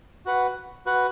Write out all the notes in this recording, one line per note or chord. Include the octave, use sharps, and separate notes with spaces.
F#4 B4 F#5
F#4 B4 F#5